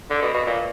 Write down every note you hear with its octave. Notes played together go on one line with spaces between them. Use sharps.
D3
B2
B2
A#2